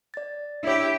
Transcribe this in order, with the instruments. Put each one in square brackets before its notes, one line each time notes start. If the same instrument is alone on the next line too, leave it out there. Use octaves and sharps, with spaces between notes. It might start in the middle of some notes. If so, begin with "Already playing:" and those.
[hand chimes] D5 A6
[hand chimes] D4 C#5 [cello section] E4 G4